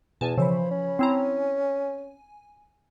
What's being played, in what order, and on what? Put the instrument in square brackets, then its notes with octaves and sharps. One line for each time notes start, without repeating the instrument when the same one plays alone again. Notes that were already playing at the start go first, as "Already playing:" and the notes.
[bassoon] E2 [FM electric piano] B2 [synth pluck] G#5 A5
[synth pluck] C#3 E3 [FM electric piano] F3 C#5 B5 [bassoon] C5
[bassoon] C#4
[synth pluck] C4 E4 A#5 [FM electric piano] G#5